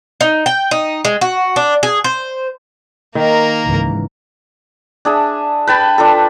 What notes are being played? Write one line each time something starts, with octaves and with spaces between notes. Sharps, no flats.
D#4
G5
D#4
G#3
F#4
D4
G#4
C5
D#3 A#3 A#4
C#2 G#2 E3
D4 G#4 E5
B4 G5 A5 B5
D4 F4 A4